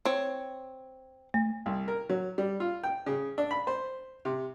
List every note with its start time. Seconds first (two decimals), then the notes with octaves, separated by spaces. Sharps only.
0.05 C4 C#5
1.34 A3
1.66 C2
1.88 A#4
2.09 F#3
2.38 G3
2.60 F4
2.84 G5
3.06 C#3
3.38 D4
3.51 B5
3.67 C5
4.25 C3